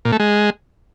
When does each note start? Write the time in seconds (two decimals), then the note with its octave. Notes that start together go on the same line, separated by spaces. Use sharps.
0.05 A#2
0.12 A3
0.20 G#3